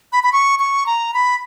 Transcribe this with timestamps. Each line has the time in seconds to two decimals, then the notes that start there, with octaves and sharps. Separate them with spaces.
0.13 B5
0.23 B5
0.33 C#6
0.59 C#6
0.86 A#5
1.14 B5